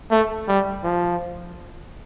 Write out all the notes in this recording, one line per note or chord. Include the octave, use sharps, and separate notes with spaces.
A3
G3
F3